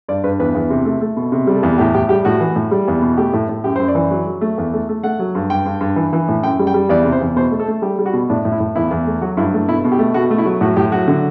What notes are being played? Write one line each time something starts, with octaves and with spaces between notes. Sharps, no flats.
G2 D5
G2 B4
E2 B4
E2
C3
A3
A3
B2
C3
G3
A4
E2
A2 G4
A2 G4
G3 G4
A2 F#4
E3
A2
G3
E2
B2
A3 G4
A2
A2
F#2 G4
F#2 C5
D5
E3
F#3
F#3
A3
E2
A3
A3
A3 F#5
F#3
G2
G2 G5
G2
G2
E3
E3
A2
F#2 G5
G3
G5
G3
E2 D5
C3
C5
E2
B2 C5
A3
A4
A3
G3 G4
G3
F#4
B2
A2 D4
A2
E4
A2
E2 E4
E2
A3
F#3 F#4
G2 E4
A3
B2 E4
B2
G4
A3
B2 F#4
A3
E4
F#3
A2 F#4
A2 G4
F#3 F#4
D3